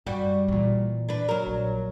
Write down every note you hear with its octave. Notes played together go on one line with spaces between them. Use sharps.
F#2 G3 F#4
A#2 E3
D4 B4
F#3 A#4
A#1